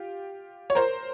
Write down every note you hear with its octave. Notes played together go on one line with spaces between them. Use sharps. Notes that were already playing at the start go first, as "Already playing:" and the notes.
Already playing: F4 G4
C#5
A#4 C5